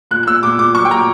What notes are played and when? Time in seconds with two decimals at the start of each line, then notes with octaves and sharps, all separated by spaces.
0.11 A#2 F#6
0.23 F#6
0.27 A#2 E6
0.43 A#2 D6
0.59 A#2 D6
0.75 F#3 C#6
0.85 G5
0.91 A#2 A#5